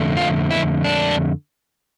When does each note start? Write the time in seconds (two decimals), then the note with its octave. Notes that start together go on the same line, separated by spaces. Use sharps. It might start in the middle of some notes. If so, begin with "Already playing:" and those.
Already playing: F2 D3 A3
0.17 F4
0.51 E4
0.84 D4